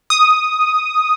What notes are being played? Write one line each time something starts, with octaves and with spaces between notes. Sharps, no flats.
D#6